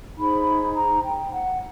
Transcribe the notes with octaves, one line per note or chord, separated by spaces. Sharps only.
D#4 G#4 C5 B5
A#5
G5
F#5